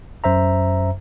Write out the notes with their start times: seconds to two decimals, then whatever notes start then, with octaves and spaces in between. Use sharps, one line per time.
0.24 F#2 C5 E5 A#5